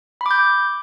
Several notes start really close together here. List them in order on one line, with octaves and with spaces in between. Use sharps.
B5 D6 G6